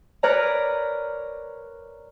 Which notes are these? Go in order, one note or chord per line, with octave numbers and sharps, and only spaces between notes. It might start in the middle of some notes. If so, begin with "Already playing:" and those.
A#4 B4 C#5 D5 A#5